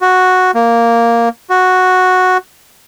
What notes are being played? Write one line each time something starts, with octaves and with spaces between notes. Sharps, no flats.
F#4
A#3
F#4